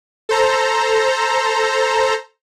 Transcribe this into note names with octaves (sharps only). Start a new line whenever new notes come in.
A4 C5 A#5